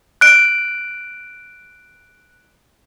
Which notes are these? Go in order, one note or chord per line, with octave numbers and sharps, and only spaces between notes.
F#6 D7